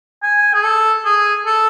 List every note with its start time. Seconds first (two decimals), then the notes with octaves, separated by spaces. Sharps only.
0.23 G#5
0.53 G#4
0.64 A4
1.05 G#4
1.46 A4